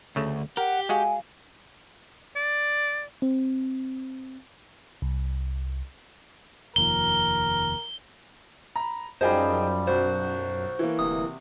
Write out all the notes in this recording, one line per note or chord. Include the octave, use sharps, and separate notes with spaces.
D2 C#3 A3
G4 A#4 F#5
G#3 F#4 G#4 F5 G#5
D5
C4
C2
F1 D#2 F3 A#4 G7
A#5 B5
F#2 F3 G3 D#4 G#4 C5 G5
B1 F#4 C5
E3 A#3
D1 C3 D#6